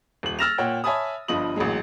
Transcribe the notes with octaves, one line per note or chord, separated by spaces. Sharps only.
D#1 F#7
E6 F6 A6 A#6 E7 F7
A#2 C#5 F#5 G5
C#5 E5 G#5 A5 B5 D#6
G1 G2 F3 D#5 D#6 F#7
A1 A#2 F#3 G#3